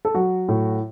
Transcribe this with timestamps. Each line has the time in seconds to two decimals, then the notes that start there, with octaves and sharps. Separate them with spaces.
0.05 A4
0.15 F#3 F#4
0.48 A2